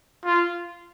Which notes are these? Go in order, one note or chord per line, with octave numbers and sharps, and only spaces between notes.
F4